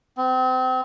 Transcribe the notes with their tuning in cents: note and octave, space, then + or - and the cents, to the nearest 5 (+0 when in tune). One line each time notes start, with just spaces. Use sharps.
C4 -35